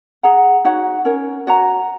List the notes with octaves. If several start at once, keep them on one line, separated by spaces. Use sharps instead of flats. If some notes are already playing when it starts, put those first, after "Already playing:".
G#4 F#5 A#5
D#4 F#4 C#5 F#5
C#4 A#4 C#5
F#4 C#5 F#5 A#5